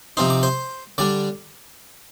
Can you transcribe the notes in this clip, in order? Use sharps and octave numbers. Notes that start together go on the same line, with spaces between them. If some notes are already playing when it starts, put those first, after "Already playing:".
C3 F3 C4 D#4 C6
D6
C5 C6
D3 G3 D4 D5 D6